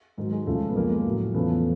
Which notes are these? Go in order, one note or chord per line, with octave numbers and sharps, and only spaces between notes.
G#2 D#3 F#3
G#3
C#2 C#3 F3 A3
B3
F2 C#3 F3 G#3 A#3
A2 F#3
E2 C#3 F3 A3 B3